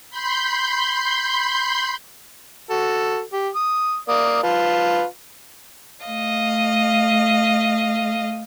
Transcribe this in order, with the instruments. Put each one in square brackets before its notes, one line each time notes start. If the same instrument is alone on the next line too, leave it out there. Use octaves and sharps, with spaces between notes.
[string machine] B5 C6 G6
[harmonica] F#4 A4
G4
D#6
A#3 D5 D#6
F4 B4 A5
[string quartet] A3 D#5 F5